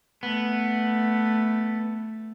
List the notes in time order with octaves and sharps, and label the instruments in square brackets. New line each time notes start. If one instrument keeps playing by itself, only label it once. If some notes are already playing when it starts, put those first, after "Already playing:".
[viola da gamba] A3 [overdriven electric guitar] B3